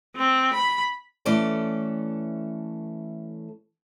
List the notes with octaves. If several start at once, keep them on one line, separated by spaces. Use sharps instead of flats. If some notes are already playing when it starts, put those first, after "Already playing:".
C4
B5
E3 A3 C#4 A4 D5